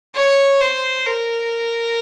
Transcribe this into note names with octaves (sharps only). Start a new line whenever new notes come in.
C#5
C5
A#4